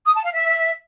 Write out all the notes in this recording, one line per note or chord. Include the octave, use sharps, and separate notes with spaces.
D#6
A5
F5
E5